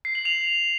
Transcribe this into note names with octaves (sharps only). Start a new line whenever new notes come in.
C7
F#7
F7